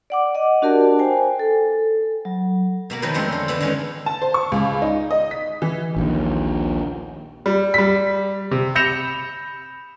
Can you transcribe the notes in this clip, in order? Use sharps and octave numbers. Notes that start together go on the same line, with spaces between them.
D5 F#5 D6
D#5 F#5
D4 F#4 G4 A#4 D5 A5
C5 G5 G#5
A4
F#3
B2 A#3 B3
D#3 F3 F#3 B4
F2 D3 G#3 A3 C5
D3
E3 B3 B4
D3 D#3 G#3 C#4
A5
C5
C#6
C#2
D#4
D#5
B6
E3
A#1 D#2
G3
G3 B6
C3
B5 G6 A#6 C#7 E7 F7